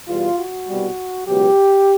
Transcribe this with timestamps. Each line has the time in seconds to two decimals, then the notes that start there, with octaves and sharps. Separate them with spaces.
0.08 E2 B2 G3 F4
0.38 F#4
0.67 C2 B2 G3
1.27 C#2 B2 F#3 G4